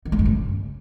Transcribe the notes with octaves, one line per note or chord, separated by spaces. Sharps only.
D#3
A3
G2
C#3